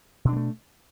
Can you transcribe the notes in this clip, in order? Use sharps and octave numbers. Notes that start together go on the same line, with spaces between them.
B2 G3 A3 D4